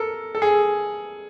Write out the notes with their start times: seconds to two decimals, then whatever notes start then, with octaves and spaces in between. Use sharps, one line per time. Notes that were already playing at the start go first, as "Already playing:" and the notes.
Already playing: A4 A#4
0.35 A4
0.42 G#4